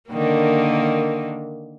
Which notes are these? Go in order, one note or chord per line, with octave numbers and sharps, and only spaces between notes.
D3 D#3 A#3